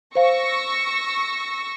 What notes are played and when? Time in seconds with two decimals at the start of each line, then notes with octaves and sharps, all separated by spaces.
0.15 C5 F5 C#6 E6 A#6